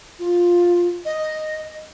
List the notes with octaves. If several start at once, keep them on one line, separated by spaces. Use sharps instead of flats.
F4
D#5